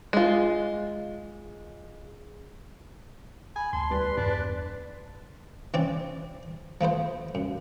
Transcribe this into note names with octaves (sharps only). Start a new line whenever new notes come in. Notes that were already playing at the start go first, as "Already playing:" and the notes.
G#3 F4
G#5 B5
D2 A5 C6
E2 G3 B4 D5
E2 G2 D4
E3 C4 C#4 D5
F3 A3 B3 C5
F#2